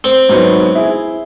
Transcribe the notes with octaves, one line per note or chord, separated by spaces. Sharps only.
C4
G#2 F#3 B3
E4 G#4